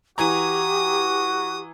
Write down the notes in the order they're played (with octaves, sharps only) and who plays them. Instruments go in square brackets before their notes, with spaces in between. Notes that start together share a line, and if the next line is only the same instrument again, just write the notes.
[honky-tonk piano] E3 G#5 A#5 [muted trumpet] F#4 [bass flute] G4 [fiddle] D#6